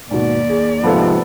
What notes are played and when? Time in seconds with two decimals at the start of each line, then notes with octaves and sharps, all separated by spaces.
0.11 D#2 G#2 B2 D5
0.49 G#4
0.84 G#2 C3 F3 B3 A4